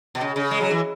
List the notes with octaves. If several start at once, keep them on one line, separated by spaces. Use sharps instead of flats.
B2
C#3
C#3
G#3
F#3
E3